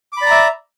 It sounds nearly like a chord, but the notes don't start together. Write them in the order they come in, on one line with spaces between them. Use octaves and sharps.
D6 B5 D5 A#5 E5